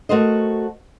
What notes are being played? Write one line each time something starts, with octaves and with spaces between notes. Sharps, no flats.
A3 F#4 A#4 C5 D#5